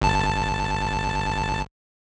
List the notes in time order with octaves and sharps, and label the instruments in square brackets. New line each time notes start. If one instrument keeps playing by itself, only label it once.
[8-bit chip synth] G1 A5